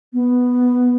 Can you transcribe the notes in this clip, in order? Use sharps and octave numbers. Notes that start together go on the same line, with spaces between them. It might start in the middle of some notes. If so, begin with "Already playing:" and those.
B3